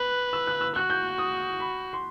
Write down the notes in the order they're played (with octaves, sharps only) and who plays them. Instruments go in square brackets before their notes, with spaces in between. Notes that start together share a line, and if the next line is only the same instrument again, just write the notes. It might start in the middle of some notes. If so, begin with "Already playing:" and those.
Already playing: [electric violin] B4 [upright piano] F#6
[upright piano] E6
F#6
E6
[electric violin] F#4 [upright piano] F#6
[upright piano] G6
D#6
B5
C6